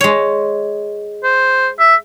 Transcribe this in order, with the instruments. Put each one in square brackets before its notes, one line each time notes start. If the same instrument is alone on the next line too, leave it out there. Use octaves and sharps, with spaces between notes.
[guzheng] G#3 C#5
[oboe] C5
E5